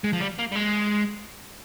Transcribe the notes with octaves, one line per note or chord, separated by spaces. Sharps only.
G#3
F3
G3
A#3
G3
G#3